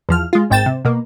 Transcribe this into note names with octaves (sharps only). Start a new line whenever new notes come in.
E2 F3 F6
G#3 F4
G#1 G#2 G5 A6 E7
C3
B2 A#3